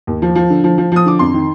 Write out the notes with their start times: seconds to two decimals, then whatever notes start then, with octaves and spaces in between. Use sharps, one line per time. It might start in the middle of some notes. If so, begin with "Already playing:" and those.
0.07 D#2
0.22 F3
0.35 F3
0.50 D3
0.64 F3
0.78 F3
0.92 F3 D#6
1.06 D3 D6
1.19 F2 C6
1.34 D#3